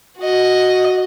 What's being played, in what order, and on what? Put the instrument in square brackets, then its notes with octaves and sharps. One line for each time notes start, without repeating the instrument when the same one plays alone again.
[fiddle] F#4 D#5